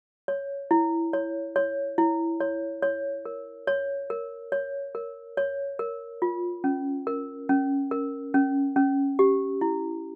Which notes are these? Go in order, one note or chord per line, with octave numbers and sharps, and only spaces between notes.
C#5
E4
C#5
C#5
E4
C#5
C#5
A#4
C#5
A#4
C#5
A#4
C#5
A#4
F4
C#4
A#4
C#4
A#4
C#4
C#4
G4
E4